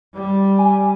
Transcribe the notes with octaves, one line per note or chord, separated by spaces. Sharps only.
G3
G#5